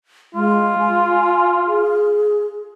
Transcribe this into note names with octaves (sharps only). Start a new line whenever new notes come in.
G#3 F4
G#5
G#4